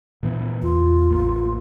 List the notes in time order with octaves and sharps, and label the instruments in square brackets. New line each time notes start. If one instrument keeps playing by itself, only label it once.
[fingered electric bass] A#2 E3 B3
[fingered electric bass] E2 [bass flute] F4
[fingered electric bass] A1 A#3